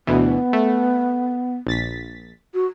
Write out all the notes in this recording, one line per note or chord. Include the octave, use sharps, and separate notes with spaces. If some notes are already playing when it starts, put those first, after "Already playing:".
D2 B2 E3 B3
A3
A#1 A6 B6
F#4